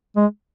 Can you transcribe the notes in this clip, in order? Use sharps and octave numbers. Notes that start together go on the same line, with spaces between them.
G#3